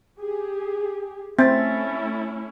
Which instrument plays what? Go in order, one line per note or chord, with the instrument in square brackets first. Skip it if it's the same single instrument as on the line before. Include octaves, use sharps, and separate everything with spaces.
[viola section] G4 G#4
[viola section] A3 C#4 E4 [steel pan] C4 [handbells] E5 A6